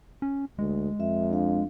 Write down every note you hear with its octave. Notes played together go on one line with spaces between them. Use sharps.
C#4
D2 G#3
F2 E5
D4 F5